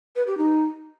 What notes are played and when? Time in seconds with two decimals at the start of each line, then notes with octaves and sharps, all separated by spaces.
0.16 B4
0.27 G4
0.38 D#4